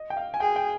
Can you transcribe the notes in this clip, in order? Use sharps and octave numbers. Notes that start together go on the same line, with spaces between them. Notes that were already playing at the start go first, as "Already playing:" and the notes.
Already playing: D#5
G5
F5
G#5
G#4 G5
G5